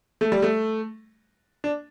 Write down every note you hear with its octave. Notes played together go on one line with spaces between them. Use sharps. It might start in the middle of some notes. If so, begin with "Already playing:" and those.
A3
G3
A3
D4